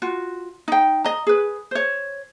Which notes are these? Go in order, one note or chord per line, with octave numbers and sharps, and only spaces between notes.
F4 F#4
D#4 G5
D#5 A#5
G#4 B4
C5 C#5